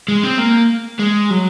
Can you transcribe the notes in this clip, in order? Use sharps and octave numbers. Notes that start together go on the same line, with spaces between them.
G#3
C4
A#3
G#3
F#3